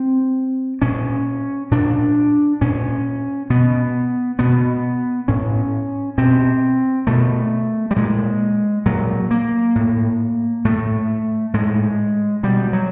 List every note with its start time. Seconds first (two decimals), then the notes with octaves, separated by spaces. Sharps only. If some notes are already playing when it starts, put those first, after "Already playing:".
Already playing: C4
0.82 A#2 C#4
1.71 A#2 D4
2.61 A#2 C#4
3.50 B2 B3
4.39 B2 B3
5.28 A2 C#4
6.18 B2 C4
7.07 B2 A3
7.91 G3
7.96 A#2 G#3
8.86 A#2 F#3
9.31 A#3
9.75 A2
10.65 A2 A3
11.54 A2 G#3
12.43 B2 G3
12.73 F#3